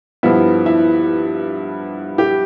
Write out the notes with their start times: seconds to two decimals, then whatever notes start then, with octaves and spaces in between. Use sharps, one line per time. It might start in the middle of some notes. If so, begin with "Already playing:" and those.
0.23 G2 F3 B3 E4
0.66 E4
2.18 G4